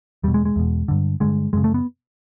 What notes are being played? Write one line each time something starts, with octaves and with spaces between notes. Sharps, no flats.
E2 B2 G3
G#3
G#3
E2 B2
G2 D3
G2 D3 G#3
F#2 C#3 G#3
A3
B3